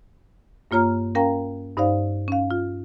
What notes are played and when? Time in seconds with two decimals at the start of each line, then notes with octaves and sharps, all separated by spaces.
0.71 G2 A#3 F4 C#5 A#5 F6
1.15 C#4 A#4 F5 G5 A#5
1.77 G2 D#4 C5 D5 F5
2.28 C#4 F5
2.51 F4